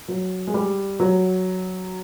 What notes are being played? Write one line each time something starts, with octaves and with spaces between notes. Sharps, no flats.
F#3
G#3
G3
F#3